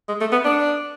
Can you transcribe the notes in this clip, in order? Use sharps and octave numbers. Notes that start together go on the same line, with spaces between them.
G#3
A3
B3
D4